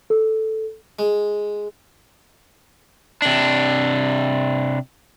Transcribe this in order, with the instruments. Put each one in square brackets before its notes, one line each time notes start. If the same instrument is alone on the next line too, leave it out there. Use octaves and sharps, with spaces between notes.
[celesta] A4
[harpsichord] G#3
[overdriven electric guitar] C3 D4